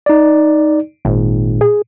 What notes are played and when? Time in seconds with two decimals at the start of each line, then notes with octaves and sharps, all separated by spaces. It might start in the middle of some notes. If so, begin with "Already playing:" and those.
0.06 D#4 D5
1.05 G#1 A#2
1.61 G#4